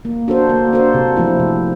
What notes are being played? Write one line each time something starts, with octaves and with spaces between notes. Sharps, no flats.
A#3
D4 F#4 A4 C5
A#3
D4 F#4 A4 C5
C3
F3 A3 C4 E4
C3